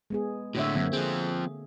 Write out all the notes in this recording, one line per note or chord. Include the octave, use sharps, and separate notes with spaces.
G#3 B3 G#4
A2 D3 F#4 C#5 E5
F#2 D3 A#3 C4
F3 C4 G#4